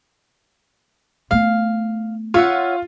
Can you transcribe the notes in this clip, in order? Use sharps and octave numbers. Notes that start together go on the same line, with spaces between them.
A3 B3 F5
F4 C#5 E5 F#5